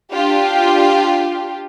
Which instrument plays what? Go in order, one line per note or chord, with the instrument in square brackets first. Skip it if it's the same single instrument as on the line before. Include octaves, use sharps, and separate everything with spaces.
[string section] D4 F4 G4